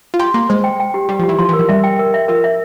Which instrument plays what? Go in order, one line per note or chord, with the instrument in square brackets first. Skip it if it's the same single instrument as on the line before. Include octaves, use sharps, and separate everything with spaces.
[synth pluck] F4
[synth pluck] G4 [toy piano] C6
[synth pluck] A#3 [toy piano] C6
[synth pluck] G#3 [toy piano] C5
[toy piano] G5
G5
G4
[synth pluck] G3 [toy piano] G4
[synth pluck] F3
[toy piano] G4
[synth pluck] E3
[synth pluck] F3 [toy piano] C6
[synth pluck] E3
[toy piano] A#4
[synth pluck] F3
[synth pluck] G3 [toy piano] E5
[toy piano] G5
A#4
E5
[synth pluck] F3 [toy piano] A#4
[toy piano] E5